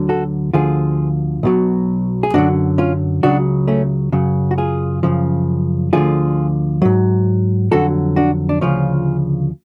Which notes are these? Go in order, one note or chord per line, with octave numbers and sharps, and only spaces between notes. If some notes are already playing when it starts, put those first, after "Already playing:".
Already playing: D2 D3 F#3
F#4 A4
D2 D3 F3 F4 G#4
B1 B2 F#3
G#4
F#2 D3 F#3 D4 F#4
C#4 F4
C#2 C#3 F#3 D4 F#4
A3 C#4
F#2 C#3 F#3
F#4
F4 G#4
F#2 C#3 F3
D2 D3 F3 F4 G#4
G#2 F#3
F2 D3 F#3 F#4 A4
D4 F#4
D4
D2 C#3 F3 C#4 F4